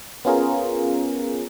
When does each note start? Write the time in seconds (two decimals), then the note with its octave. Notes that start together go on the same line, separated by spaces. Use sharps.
0.25 B3 C#4 F4 G#4 A#4